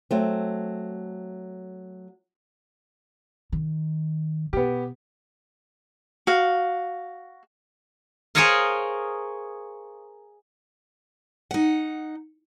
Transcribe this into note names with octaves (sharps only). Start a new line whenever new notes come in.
F#3 A3 C4
D#3
B2 B3 G4
F#4 F5
G#4 A#4 C5 C#5 D#5 F5
D#4 F#5